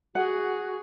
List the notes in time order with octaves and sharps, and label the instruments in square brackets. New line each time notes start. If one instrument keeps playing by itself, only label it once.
[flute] F#4 [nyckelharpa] G#4 [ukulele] F#5